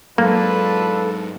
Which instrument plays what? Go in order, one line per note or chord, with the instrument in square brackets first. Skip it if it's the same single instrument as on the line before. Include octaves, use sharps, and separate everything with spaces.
[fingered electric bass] G#2 F#3 G#3 [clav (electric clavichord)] A#3 [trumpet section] D4 F4 B4 [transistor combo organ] A4